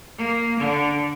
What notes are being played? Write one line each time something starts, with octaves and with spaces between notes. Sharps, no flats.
A#3
D3